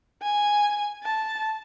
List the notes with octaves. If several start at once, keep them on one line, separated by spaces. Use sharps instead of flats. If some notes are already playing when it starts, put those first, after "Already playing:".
G#5
A5